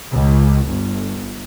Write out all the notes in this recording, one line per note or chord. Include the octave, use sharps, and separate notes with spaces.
C#2
G1